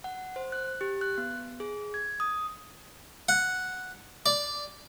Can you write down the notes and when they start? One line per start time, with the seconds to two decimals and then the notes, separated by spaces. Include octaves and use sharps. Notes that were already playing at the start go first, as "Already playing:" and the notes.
0.04 F#5
0.36 C5
0.52 F#6
0.81 G4
1.01 F#6
1.18 B3
1.60 G#4
1.94 G#6
2.20 D#6
3.29 F#5
4.26 D5